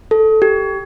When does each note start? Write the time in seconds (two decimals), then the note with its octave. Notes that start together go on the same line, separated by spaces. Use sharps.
0.11 A4
0.42 G4